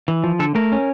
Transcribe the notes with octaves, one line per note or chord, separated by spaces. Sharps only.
E3
F3
D3 A4
A3 A#4
C#4